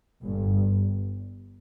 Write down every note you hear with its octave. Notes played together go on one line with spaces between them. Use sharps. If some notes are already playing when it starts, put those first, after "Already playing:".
G1 G2